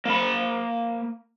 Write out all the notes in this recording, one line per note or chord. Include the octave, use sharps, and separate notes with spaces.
A#3 B5